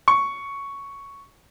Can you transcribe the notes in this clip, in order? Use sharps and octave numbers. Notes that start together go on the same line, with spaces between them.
C#6